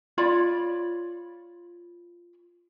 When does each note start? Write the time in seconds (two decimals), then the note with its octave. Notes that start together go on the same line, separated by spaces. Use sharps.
0.18 F4 C#5 D5 B5